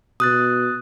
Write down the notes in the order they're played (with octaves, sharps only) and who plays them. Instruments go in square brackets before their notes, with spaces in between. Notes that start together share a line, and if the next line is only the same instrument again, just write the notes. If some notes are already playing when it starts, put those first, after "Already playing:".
[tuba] B2 [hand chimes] D#6 F#6 A6